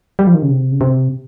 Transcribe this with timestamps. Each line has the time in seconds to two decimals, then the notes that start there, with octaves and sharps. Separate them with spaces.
0.19 G3
0.27 F3
0.34 D#3
0.42 C#3
0.51 C3
0.72 C#3
0.81 C3